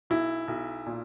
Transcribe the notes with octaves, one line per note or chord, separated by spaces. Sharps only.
B1 E4
B1
A#2